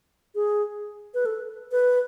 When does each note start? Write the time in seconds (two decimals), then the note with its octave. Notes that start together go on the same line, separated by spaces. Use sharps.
0.35 G#4
1.14 B4
1.26 A4
1.72 B4